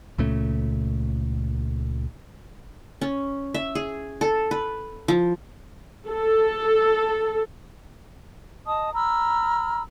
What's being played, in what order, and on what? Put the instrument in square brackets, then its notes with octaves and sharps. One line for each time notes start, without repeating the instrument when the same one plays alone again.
[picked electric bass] C#2 A#2 C#3 A3
[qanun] C#4
E5
G#4
A4
B4
F3
[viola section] A4
[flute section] D#5 A5 D#6
A#5 B5 E6 F6